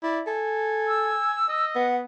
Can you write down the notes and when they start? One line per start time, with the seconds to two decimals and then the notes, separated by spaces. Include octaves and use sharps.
0.03 E4 D5
0.27 A4 G#5
0.88 E6
1.49 D#5
1.76 B3 F#5